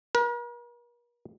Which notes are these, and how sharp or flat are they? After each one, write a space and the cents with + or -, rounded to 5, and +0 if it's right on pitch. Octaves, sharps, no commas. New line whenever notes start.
A#4 +45